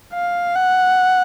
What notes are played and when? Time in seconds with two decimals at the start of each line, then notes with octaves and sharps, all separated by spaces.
0.14 F5
0.56 F#5